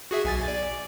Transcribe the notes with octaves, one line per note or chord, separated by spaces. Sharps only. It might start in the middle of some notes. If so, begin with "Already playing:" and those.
F#4 G#4 E5
B1 G#5 A6
D5